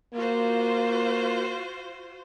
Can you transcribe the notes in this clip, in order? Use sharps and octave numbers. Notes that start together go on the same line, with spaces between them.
A#3 F4 F#4 C5